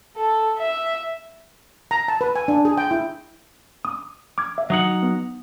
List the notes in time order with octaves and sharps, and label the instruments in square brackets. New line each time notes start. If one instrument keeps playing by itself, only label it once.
[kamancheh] A4
E5
[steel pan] A#5
A5
B4
G#5
D4
G#4
G5
E4
[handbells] D6 D#6
D6 F6 G#6
E5
[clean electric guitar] F#3 D#4 F#5
[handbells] B3